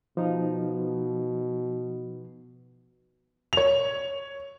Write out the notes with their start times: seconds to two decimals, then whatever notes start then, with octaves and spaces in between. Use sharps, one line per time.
0.17 B2 F3 D#4
3.53 C#5 F7